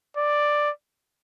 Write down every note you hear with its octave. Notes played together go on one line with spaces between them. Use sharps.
D5